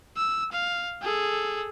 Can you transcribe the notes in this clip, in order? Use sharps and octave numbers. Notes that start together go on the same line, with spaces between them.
E6
F5
G#4 A4